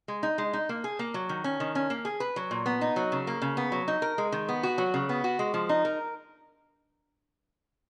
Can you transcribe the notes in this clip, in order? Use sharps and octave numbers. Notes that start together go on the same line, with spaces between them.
G#3
D#4
G#3
D#4
A#3
G#4
A#3
F#3
D#3
C#4
D#3
C#4
A#3
G#4
B4
F#3
A#2
B3
D#4
F#3
C#3
A#3
C#3
B3
F#3
D#4
A#4
G#3
D#3
B3
F#4
F#3
C#3
B3
F#4
G#3
F3
D#4
A#4